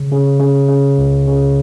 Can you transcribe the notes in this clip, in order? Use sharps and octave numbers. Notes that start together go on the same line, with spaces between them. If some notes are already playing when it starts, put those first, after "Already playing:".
Already playing: C#3
C#3
C#3
C#3
C#2
C#3